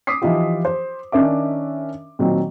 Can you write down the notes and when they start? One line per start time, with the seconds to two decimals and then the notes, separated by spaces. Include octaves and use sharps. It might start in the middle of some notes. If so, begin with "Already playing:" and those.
0.07 D6 D#6 B6 C7
0.22 E3 F3 D#4 F4 G4
0.65 C5
1.12 D#3 C#4 D4 A#4 E5 D6
2.19 A#2 D#3 F#3 C4